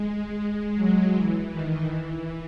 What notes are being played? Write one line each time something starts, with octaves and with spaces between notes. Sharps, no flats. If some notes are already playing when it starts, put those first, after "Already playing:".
Already playing: G#3
F#3
E3
D#3
E3